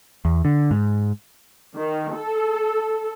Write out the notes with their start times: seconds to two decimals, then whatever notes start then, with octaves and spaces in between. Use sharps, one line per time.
0.25 E2
0.45 D3
0.71 G#2
1.77 D#3
2.13 A4